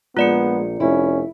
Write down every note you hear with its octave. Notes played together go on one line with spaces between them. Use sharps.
A#1 G#3 B3 F4 D5 C#7
F1 C#4 E4